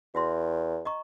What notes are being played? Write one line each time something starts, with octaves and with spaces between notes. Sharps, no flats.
E2 F#4 E5 C6
D#5 A#5 C#6